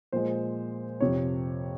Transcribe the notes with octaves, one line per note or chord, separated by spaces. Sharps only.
A#2 F3 G#3 C5
F2 C3 F3 C#5